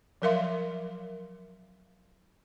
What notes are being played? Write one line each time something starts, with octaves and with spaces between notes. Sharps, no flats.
F3 F#3 A#4 E5 F5 C6